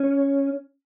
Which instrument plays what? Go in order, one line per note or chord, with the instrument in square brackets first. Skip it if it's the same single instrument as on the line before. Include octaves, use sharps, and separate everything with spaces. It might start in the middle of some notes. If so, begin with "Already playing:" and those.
Already playing: [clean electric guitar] C#4